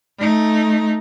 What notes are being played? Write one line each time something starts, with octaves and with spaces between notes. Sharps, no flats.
A3 D#4